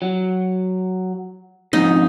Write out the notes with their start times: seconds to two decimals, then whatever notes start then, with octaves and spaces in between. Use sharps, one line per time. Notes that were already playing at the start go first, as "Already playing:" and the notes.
0.02 F#3
1.73 F2 G#2 D#4